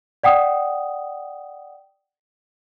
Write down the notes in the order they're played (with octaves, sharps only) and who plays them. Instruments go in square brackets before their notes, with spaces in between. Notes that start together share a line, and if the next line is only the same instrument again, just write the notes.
[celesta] D5 F#5 G5 D#6